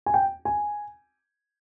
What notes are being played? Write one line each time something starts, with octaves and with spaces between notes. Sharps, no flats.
G#5
G5
G#5